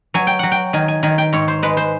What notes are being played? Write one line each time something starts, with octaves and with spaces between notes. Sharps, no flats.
F#3 G#5
G5
F#3 F#5
G5
D#3 G#5
G#5
D#3 G#5
G5
G#2 C#5
C5
G#3 B4
C5